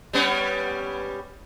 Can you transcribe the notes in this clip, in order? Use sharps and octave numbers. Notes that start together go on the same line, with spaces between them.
G3 B3 C#4